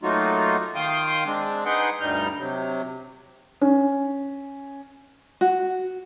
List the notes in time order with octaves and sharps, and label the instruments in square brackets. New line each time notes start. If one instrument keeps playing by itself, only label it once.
[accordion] F#3 A3 A#3 D#4 F4 F#4
D#3 F5 G5 C6 D#6
G#3 C4 D4
D#4 G#4 B4 F#5 G5 C6
D2 G2 G3 D#4 F6 G6
C3 F#3
[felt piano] C#4
[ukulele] F#4